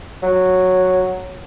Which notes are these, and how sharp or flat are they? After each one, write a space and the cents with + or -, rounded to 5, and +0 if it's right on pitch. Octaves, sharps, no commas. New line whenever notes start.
F#3 -5